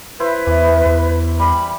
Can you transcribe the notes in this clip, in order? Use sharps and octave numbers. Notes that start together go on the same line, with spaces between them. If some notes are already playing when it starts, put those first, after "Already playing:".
E4 B4 C5
E2 E3
E2
G3 B5